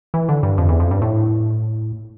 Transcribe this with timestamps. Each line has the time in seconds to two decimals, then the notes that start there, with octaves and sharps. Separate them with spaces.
0.14 E3
0.29 D3
0.43 G2
0.58 F2
0.69 E2
0.80 F2
0.91 G2
1.02 A2